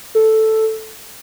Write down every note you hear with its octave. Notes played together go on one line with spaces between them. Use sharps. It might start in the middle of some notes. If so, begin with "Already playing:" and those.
A4